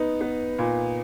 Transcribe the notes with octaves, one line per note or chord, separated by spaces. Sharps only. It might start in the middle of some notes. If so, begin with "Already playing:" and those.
Already playing: B3 D#4
B3
A#2